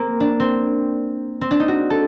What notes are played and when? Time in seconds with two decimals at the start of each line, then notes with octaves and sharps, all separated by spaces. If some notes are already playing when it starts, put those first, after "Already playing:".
Already playing: A#3 C4
0.20 D4
0.40 C4
1.41 C4
1.51 D4
1.60 D#4
1.68 F#4
1.90 A4